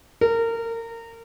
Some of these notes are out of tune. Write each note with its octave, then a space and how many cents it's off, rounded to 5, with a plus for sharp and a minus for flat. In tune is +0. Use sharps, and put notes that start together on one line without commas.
A#4 -25